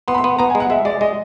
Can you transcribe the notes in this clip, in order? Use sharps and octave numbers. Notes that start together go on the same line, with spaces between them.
B3 C6
B5
C6
B3
B3 A#5
G#5
G#3
F#5
G#3 E5
G#3 D5
G#3 D#5